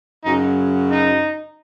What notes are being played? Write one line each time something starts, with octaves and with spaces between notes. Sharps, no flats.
F#2 C#3 F#3 D#4
D#4